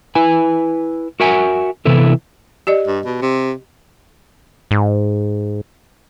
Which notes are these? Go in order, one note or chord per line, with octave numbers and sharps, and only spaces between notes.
E4 B4 G#5
F#4 A#4 E5 F#5 G#5
C3 E3 B3 E4 A4
G4 D5 D#5
G2
B2
C3
G#2